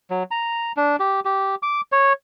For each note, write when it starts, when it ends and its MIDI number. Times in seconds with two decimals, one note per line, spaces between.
0.10 0.23 54
0.31 0.72 82
0.77 0.96 62
1.00 1.20 67
1.25 1.55 67
1.63 1.81 86
1.92 2.13 73